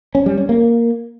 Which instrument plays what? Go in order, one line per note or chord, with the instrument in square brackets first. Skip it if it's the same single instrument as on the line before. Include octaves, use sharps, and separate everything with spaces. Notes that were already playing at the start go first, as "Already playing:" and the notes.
[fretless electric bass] C#4
G3
C#4
A#3